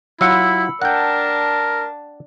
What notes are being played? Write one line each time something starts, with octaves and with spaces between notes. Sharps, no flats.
F#3 E4 F4 F#5 B5 E6 C#7
D4 A#4 F#5 G5 A5